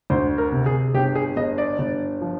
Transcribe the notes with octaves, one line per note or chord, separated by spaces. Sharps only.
D2 C5
A#4
C3
G#4
G1 G4
G#4
G1 D#5
D5
G1
F3